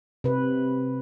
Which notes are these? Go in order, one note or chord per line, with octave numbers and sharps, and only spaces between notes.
C3 B4